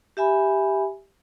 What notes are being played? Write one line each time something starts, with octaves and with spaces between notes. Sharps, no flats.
G4 E5 G#5 B5